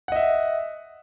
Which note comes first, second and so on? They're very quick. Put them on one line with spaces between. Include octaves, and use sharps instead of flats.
F#5 D#5 E5